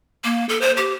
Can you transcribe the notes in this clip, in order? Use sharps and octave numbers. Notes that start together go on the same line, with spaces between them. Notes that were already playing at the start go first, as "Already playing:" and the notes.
A#3
A4
C5
G4